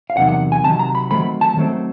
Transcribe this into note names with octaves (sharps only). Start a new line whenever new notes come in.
F5
E2 C3 D#3 F#3 F#5
F#5
G#5
E2 C3 D#3 F#3 A5
A#5
B5
D#3 F#3 A3 C4 B5
A5
D#3 F#3 A3 C4